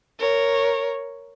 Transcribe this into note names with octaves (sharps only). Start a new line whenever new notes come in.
A#4 C#5